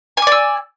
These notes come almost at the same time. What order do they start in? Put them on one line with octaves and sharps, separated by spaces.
G#5 D6 D5 E6